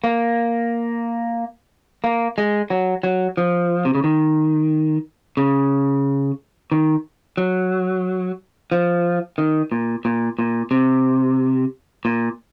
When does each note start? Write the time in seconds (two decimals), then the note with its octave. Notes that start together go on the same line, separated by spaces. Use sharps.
0.04 A#3
2.04 A#3
2.38 G#3
2.70 F#3
3.03 F#3
3.37 F3
3.85 C3
3.95 C#3
4.04 D#3
5.37 C#3
6.72 D#3
7.38 F#3
8.72 F3
9.38 D#3
9.72 A#2
10.05 A#2
10.39 A#2
10.71 C3
12.05 A#2